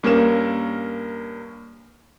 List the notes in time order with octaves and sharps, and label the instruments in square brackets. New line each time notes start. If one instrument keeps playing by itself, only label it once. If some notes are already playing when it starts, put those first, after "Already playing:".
[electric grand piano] G2 A#3 C#4 A#4 E7